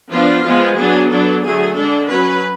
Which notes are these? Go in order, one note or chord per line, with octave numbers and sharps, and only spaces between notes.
F3 B3 D4 F4
F3 G#3 B3
F#3 B3 D4 G#4
F#3 B3 D4 A4
D3 F#3 A3 G#4
D3 G#3 D4 A4
F#3 C#4 B4